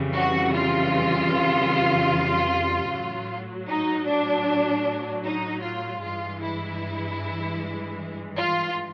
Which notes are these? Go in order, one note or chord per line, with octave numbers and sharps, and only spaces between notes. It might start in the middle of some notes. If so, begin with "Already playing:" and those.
Already playing: F2 C#3 E3 G3
F#4
F4
A2 F#3
D#4
D4
D#4
F4
G2 E3 G#3 F4
E4
F4